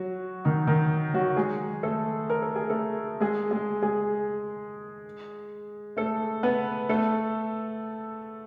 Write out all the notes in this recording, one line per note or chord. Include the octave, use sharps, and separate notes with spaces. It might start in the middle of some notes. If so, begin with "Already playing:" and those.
Already playing: F#3 F#4
D#3 D#4
D#3 D#4
F#3 F#4
G#3 G#4
A3 A4
A#4
A4
G#4
A3 A4
G#3 G#4
G#3 G#4
G#3 G#4
A3 A4
B3 B4
A3 A4